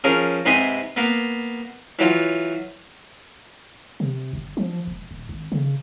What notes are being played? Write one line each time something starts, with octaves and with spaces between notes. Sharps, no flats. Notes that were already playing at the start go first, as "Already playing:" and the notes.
F3 C#4 G#4 A#4
G#2 C3 B4 G#5 C6 D#6
A#3 B3
E3 F#3 F4
C3
G1
F3
E1
D#1
G#1
C#3